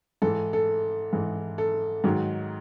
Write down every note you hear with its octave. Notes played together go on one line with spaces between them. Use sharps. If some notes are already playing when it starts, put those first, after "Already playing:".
G#2 E3 A4
A4
G#2 E3
A4
G#2 D#3 F#3